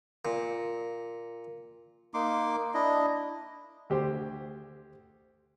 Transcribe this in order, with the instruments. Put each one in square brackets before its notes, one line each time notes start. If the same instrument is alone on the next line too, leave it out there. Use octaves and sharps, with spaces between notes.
[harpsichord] A#2
[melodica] A#3 D#4 C6 D6
D4 E4 D#5
[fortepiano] D2 G4 C5